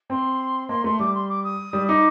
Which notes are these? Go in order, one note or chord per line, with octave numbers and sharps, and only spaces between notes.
C4 C6
A#3 C6
A3 C6
G3 D6
C6
D6
D#6
G3
D#4 D6